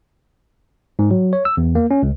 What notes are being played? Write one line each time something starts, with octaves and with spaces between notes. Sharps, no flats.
G#2
F#3
C#5
E6
E2
A#3
C#4
C#2